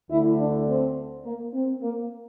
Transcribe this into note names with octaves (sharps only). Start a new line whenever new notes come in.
D2 D3 A3 E4
D4
C4
A#3
C4
A#3